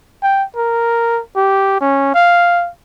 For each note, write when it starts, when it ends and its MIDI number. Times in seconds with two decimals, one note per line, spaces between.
0.22 0.44 79
0.56 1.21 70
1.36 1.77 67
1.80 2.12 61
2.14 2.69 77